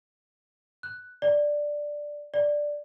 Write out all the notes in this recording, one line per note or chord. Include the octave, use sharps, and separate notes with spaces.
F#6
D5
D5